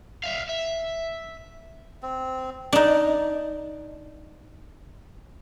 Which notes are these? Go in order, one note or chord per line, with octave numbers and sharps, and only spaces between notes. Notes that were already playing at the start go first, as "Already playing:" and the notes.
E5 F5
E5
C4
D4 D#4